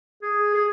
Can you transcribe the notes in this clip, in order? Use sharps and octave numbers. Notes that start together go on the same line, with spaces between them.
G#4
G#4